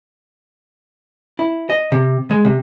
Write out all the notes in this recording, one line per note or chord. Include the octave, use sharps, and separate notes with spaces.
E4
D#5
C3
G#3
C3